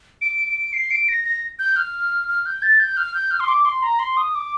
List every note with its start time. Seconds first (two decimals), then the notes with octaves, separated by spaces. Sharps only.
0.21 D7
0.48 D7
0.73 C7
0.91 D7
1.08 A#6
1.24 A#6
1.59 G6
1.76 F6
2.28 F6
2.46 G6
2.62 A6
2.80 G6
2.97 F6
3.14 G6
3.31 F6
3.40 C6
3.48 D6
3.65 C6
3.83 A#5
3.99 C6
4.17 D#6
4.35 D6